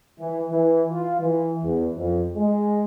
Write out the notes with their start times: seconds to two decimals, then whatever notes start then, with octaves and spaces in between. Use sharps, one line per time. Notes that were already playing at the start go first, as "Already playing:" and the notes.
0.19 E3
0.51 E3
0.91 F4
1.20 E3
1.63 E2
1.95 F2
2.36 G#3